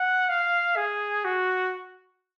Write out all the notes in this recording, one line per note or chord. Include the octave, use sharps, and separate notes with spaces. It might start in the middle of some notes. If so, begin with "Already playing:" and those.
Already playing: F#5
F5
G#4
F#4